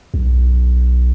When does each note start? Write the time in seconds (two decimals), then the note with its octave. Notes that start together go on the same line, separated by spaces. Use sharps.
0.14 B1